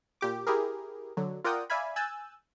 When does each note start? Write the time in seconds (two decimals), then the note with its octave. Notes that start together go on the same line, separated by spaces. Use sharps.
0.21 A#2 G4 D6
0.47 E4 G4 G#4 A#4
1.17 D3 F#3
1.44 F4 A#4 D5 F#5 G5 D#6
1.70 D5 E5 F5 G#5 B5
1.96 G#5 E6 F#6 G6 A6